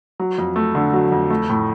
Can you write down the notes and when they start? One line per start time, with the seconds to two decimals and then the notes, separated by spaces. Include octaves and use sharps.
0.20 F#3
0.38 F2
0.56 A3
0.75 D3
0.93 F#3
1.12 F2
1.30 A3
1.50 A2